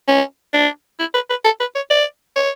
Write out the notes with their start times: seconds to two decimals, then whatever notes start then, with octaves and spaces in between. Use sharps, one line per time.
0.08 C#4
0.54 D4
1.00 E4
1.14 B4
1.30 B4
1.45 A4
1.60 B4
1.75 C#5
1.90 D5
2.36 C#5